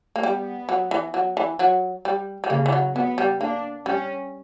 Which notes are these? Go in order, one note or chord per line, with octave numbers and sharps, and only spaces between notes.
A#3
G3 B3
F#3
E3
F#3
E3
F#3
G3
G3
C#3 A#3
E3
F#3
F#3 B3
G3
A#3 D4
G3 C#4